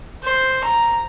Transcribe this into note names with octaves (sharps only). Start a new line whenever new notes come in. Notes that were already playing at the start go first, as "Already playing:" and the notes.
C5
A#5